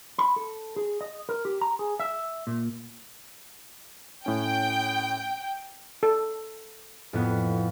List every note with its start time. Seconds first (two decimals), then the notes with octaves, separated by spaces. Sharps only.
0.18 B5
0.36 A4
0.76 G#4
1.01 D#5
1.29 A#4
1.45 G4
1.61 A#5
1.79 G#4
2.00 E5
2.47 A#2
4.26 A2 C#4 G5
6.03 A4
7.13 F2 A2 B3